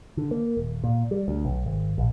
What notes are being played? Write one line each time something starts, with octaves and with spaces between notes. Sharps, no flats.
D3
A#3
D#1
A#2
G3
D2
B1
G#1
A#1